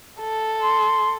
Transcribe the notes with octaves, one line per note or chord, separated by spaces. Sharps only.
A4
C6